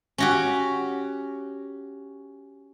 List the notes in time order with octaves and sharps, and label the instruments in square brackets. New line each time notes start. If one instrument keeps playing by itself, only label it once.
[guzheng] C#4 F#4 G4